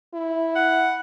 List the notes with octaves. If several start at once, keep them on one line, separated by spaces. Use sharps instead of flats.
E4
F#5